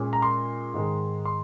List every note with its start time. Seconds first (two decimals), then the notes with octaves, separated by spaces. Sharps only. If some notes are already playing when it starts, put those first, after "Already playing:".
Already playing: A#2 G#3 C#4
0.13 A#5
0.22 C6
0.74 G#2 D#3 G#3
1.25 C6